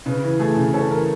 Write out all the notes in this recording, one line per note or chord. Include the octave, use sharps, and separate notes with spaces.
C#3 B4
E3
A3 G#4
C#3
C#4 A4
E3 A#4